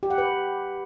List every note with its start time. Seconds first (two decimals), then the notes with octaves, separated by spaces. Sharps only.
0.03 G4
0.10 F#5
0.18 B4